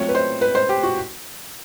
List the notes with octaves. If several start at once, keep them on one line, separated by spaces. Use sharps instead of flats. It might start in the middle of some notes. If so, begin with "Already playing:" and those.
Already playing: F#3 A3 C4 F4 C#5
B4
C5
B4
C5
G4
F#4